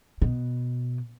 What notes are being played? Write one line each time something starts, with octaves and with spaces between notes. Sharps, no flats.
B2